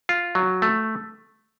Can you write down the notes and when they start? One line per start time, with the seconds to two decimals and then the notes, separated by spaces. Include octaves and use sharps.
0.09 F4
0.35 F#3
0.62 A3